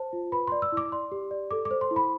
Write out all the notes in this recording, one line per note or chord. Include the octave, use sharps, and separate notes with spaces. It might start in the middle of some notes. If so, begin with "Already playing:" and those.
Already playing: C5 A5
F4
B4 B5
D5 C6
E6
E4 D6
D5 C6
G4
D5
A4 D6
D6
C5
C6
E4
B5